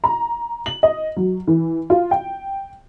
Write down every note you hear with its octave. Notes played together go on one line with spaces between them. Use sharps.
A#5
F#7
D#5
F#3
E3
F4
G5